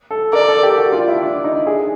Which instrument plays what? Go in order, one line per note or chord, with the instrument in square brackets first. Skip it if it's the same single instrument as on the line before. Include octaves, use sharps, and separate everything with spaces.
[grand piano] A4
[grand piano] A#4 [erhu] D5
[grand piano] A4
G4
F#4
F4
E4
D4
D#4
G#4